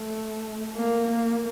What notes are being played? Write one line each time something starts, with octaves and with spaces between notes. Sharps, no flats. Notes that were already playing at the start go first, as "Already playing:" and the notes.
Already playing: A3
A#3
A#3